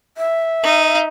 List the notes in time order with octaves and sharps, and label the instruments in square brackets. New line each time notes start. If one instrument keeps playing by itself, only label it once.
[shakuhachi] E5
[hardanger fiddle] D#4